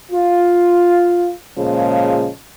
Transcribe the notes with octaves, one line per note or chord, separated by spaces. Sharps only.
F4
A#2 C#3 F3 G#3